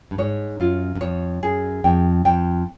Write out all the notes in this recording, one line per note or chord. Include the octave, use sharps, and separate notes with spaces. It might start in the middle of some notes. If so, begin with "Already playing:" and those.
G2
G#2 C#5
F#2 F4
F#2
F2 C#5
F#2 G#4
F2 G5
F2 G5